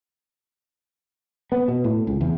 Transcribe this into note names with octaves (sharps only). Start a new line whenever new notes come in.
B3
B2
A2
C#2
E2